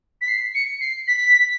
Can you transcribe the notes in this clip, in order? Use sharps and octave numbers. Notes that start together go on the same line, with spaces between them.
B6
C7
C#7
C7
B6